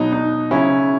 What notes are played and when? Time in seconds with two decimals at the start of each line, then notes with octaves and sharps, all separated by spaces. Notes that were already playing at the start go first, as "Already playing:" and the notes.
Already playing: B2 F#3 D#4
0.12 D#4
0.51 C#3 F#3 C#4 E4